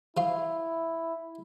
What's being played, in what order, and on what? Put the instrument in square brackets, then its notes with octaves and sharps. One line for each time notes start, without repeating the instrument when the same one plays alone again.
[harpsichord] F3 F4 [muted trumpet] E4